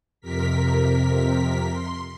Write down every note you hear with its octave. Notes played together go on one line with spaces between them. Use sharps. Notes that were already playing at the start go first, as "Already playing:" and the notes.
F2 C3 A#4 B6
C6